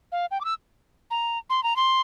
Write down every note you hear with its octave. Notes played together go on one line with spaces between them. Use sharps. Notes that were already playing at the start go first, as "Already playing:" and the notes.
F5
G5
D6
E6
A#5
C6
A#5
C6